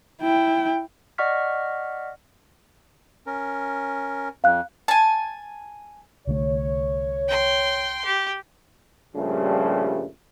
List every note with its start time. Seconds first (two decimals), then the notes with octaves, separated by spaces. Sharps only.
0.22 E4 G5
1.18 D5 D#5 F#5 C#6 F6 B6
3.27 C#4 A#4
4.44 F2 F5 F#6
4.88 G#5 A5
6.27 C2 D3 A3 C#5
7.28 G5 C6
8.05 G4
9.16 G2 A#2 C#3 F3 G3 A3